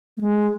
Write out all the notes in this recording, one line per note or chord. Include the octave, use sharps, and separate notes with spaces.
A3
G#3